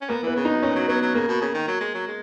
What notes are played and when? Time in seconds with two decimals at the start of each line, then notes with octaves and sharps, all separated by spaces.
0.01 C#4
0.09 A#3 B3
0.23 E3 B3
0.36 C#3
0.45 D#4
0.49 F#2
0.62 A#2 C#4
0.76 F#3
0.88 F#3 B3
1.02 F#3
1.14 C#3 A#3
1.28 B2
1.41 C#3
1.54 D#3
1.67 F#3
1.81 G#3
1.94 F#3
2.07 G#3